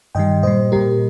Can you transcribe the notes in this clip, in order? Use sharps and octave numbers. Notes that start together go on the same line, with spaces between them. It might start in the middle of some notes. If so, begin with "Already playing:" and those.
G2 D#3 G3 D#5 G5
A#2 G3 C5 D#5
A#2 G3 G4 A#4